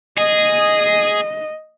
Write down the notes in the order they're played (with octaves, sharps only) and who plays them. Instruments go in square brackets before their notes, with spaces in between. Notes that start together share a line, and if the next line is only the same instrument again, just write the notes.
[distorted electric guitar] G#4 [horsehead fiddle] D#5